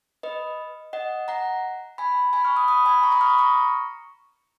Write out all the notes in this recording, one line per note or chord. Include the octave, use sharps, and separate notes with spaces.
B4 D#5
D#5 F#5
F#5 A#5
G#5 B5
G#5 B5
C#6 F6
B5 D#6
B5 D#6
G#5 B5
A#5 C#6
B5 D#6
C#6 F6
B5 D#6
A#5 C#6